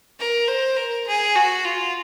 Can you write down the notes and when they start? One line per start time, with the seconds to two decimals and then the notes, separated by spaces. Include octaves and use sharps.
0.20 A#4
0.48 C5
0.77 A#4
1.07 G#4
1.35 F#4
1.65 F4